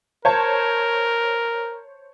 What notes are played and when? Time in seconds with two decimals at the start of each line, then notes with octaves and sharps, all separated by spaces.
0.25 A#4 C5 C#5 A5